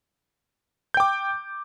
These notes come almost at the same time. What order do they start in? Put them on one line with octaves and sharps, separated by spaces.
G6 G5 D6